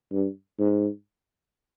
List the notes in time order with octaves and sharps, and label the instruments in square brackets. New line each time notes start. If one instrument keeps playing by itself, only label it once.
[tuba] G2
G#2